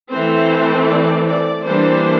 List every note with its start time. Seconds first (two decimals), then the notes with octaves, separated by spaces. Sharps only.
0.10 E3 A3 C4 C5
0.88 D5
1.27 D5
1.66 E3 G3 A#3 D4 C5